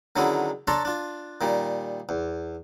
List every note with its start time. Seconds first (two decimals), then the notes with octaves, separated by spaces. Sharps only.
0.16 D3 D#3 F#3 G#3 C#4 E4
0.67 D4 A4 C#5 A5 A#5 C6
0.85 D4 F4
1.41 A#2 D#3 G3
2.09 E2